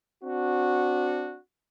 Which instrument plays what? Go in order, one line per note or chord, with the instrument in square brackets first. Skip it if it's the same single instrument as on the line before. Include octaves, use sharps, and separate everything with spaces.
[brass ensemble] C4 D4 F#4